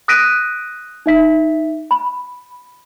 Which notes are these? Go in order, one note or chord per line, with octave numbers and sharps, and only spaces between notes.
D#6 F#6 A#6 B6 D7 D#7
D#4 E5 B6
B5